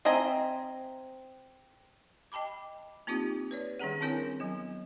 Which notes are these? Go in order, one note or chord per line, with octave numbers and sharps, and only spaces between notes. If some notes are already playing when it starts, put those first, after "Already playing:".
C4 D#5 E5 G#5 A#5
D#5 G5 A5 B5 D6
A#3 C4 D#4 F4 G4
B4 C#5 D5
D#3 G3 C#4 G#4 F#5
C4 D4 E4 A#4 C#5 G#5
F#3 B3